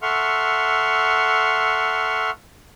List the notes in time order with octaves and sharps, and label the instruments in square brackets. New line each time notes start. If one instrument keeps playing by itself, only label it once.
[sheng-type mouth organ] A4 E5 F#5 C6 C#6 F6